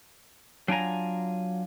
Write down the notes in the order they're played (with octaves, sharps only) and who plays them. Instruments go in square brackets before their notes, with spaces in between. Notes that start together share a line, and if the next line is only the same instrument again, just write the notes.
[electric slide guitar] F#3 D4 F4 G#5 A#5